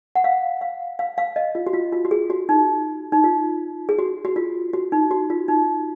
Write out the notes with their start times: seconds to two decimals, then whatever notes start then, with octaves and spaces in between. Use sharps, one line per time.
0.16 F#5
0.24 F5
0.61 F5
0.99 F5
1.18 F5
1.36 D#5
1.55 F4
1.67 F#4
1.73 F4
1.92 F4
2.05 F#4
2.11 G#4
2.30 F#4
2.49 D#4
3.12 D#4
3.24 F4
3.89 G#4
3.99 F#4
4.25 F#4
4.36 F4
4.73 F#4
4.92 D#4
5.11 F#4
5.30 F4
5.48 D#4